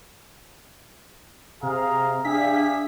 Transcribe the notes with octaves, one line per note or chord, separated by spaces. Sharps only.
C3 G#4 F5 A#5
D4 G4 G#4 E5 F5 B6